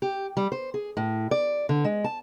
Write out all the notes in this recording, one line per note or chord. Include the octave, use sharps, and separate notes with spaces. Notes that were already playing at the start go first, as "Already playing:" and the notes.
G4
G3
C5
G#4
A2
D5
D3
G#3
A5